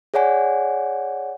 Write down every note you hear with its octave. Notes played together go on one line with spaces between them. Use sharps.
G#4 C#5 D5 F#5 G#5